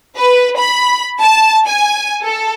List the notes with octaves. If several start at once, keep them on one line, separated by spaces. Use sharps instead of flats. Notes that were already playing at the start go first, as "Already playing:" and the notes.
B4
B5
A5
G#5
A4